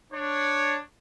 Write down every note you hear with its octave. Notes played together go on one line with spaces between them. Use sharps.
D4 C#5